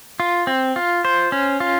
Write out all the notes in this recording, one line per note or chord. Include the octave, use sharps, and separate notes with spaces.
F4
C4
F4
C5
C#4
F4